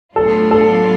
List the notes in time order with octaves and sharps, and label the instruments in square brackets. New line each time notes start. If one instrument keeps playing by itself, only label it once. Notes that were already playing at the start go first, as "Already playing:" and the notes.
[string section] A2 F#3 B3 D4 F4 [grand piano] A4
[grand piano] A4